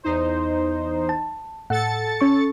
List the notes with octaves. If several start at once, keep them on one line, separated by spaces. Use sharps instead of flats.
E2 D#4 C5
A5
A2 A4 F#5 A6 C#7
C#4 C#6